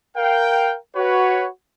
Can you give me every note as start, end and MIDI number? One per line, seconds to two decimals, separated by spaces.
0.17 0.75 70
0.17 0.75 77
0.17 0.75 79
0.96 1.46 66
0.96 1.46 71
0.96 1.46 73